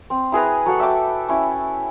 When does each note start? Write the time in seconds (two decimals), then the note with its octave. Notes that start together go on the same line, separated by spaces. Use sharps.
0.10 C4
0.32 E4 G#4 B4 A#5
0.66 F#3 A4 F#5
0.80 E5 G5 D6
1.28 C#4 E4